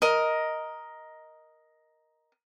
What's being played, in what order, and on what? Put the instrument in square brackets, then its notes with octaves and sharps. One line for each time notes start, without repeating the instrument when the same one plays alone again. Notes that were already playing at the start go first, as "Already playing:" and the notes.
[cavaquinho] A#4 D#5